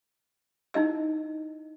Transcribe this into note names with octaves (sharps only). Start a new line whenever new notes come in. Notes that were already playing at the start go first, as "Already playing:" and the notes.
D#4 E4 D#5 E6